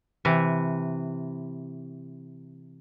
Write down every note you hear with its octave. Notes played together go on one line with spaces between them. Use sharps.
C3 E3